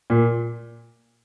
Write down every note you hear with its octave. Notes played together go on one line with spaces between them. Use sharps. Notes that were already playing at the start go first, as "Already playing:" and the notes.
A#2